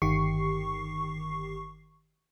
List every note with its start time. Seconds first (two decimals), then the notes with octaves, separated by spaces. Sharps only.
0.02 G1 D#3 G4 C#6 C7